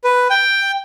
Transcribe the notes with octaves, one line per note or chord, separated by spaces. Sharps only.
B4
G5